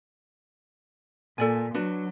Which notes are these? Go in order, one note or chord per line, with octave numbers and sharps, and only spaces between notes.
A#2 A4 D5 G#5
F#3 D4 F#4 B4